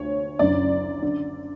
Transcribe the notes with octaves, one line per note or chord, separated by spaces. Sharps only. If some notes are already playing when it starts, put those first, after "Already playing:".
Already playing: D2 C#5
F#1 F#2 D3 D5
D3